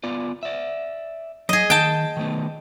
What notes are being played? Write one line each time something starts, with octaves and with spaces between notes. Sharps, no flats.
B3 F4 D5
D5 E5
F#3 G#4 D#5
D#3 G5 A5
D#3 A3 B3